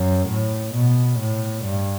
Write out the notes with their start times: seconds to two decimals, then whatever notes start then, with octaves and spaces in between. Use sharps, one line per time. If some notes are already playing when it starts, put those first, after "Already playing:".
Already playing: F#2
0.29 A2
0.74 B2
1.19 A2
1.64 G2